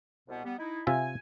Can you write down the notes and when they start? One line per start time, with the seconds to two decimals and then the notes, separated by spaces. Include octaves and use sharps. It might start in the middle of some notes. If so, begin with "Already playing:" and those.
0.28 C2 B2 B3
0.45 G3 B3
0.59 D#4 E4
0.87 C3 F4 E5 G#5